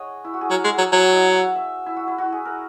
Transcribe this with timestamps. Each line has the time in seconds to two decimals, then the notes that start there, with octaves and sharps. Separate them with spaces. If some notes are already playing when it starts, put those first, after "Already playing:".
Already playing: G#4 C#5 D#5 F#5
0.24 E4
0.34 F#4
0.41 G#4
0.50 F#3 A#4
0.64 G#3 G#4
0.71 F#4
0.78 F#3
0.92 F#3 E4
1.03 F#4
1.13 D#5
1.24 F#5
1.35 E5
1.55 E5
1.86 E4
1.96 F#4
2.08 E4
2.18 F#4
2.32 G#4
2.45 A#4